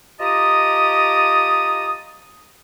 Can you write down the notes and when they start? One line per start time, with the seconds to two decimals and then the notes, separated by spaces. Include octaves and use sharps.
0.20 F4 G4 D#5 A5 A#5 D#6